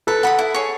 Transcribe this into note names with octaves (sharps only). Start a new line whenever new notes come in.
A4 B4
F#5 B5 D#6
E4
G#4 C#5